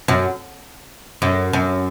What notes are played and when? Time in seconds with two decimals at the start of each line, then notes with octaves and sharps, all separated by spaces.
0.08 F#2
1.22 F#2
1.53 F#2